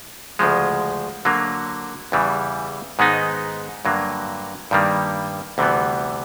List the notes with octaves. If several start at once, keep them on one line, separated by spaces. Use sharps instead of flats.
D2 C#3 F3 G#3
D3 F#3 A#3
E2 C#3 E3 G3
G#2 D#3 G#3 B3 D#4
G2 D3 F#3 A#3
G2 D#3 G3 A#3
D2 C3 E3 G3 B3